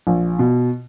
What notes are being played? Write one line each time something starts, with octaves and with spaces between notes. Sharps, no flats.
A#1
B2